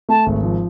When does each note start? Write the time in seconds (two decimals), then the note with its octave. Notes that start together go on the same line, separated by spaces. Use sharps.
0.09 A3 A5
0.26 G#1
0.43 F3